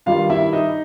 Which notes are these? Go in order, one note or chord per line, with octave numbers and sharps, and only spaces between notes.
G2 D#3 G3 F4 F5
E4 E5
D#4 D#5